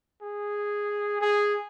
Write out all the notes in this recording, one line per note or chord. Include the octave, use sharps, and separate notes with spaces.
G#4
G#4